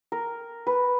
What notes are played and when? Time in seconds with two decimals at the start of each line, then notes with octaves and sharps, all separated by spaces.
0.12 A#4
0.67 B4